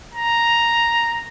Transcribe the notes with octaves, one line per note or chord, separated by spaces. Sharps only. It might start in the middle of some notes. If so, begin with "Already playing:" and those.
A#5